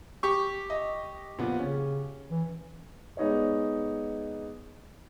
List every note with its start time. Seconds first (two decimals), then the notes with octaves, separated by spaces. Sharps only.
0.23 G4 C#6
0.70 D#5
1.39 A#2 F3 B3
1.59 C#3 C#4
2.31 E3
3.17 G#3 B3 D#4 C#5 D5